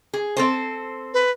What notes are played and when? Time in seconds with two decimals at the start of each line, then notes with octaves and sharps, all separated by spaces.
0.13 G#4
0.36 C4 A4 C5
1.14 B4